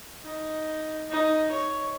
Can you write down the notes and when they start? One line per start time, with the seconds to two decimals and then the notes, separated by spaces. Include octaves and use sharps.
0.23 D#4
1.10 D#4
1.51 C#5